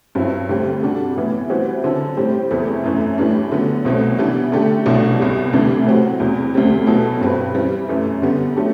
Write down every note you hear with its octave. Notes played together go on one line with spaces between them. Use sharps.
G2 F#3 C4 E4
D2 D3 G3 C4 G4
C3 G3 D4 F#4 A4
A2 E3 B3
E3 G3 C4 F#4 C5
D3 F#3 C4 E4 A4
A2 G3 C4 G4 C5
E2 C3 E3 A3 C4
F#2 E3 A3
A2 E3 G3 D4
D3 F#3 B3
C2 B2 F#3 A3 C4
E3 G3 B3 D4
D3 A3 D4 G4
C2 B2 F#3 A3 D4
C2 B2 G3
D2 C3 E3 G3 D4
A2 F#3 C4 F#4
E2 C3 F#3
D2 C3 G3 C4
B2 F#3 B3 E4 A4
G2 F#3 C4 G4 B4
E3 G3 C4
F#2 E3 A3
D3 G3 B3
F#3 A3 D4 G4